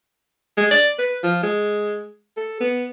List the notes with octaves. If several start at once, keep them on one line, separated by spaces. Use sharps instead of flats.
G#3
D5
B4
F3
G#3
A4
B3